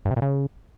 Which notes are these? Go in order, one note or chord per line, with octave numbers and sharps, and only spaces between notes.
G2
C3
A#2
C#3